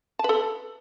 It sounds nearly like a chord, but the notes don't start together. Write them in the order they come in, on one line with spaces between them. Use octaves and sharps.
A5 B4 A4